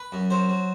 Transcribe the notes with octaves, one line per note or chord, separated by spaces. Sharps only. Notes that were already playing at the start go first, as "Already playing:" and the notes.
Already playing: B4
F#2
F#3 C5
F#3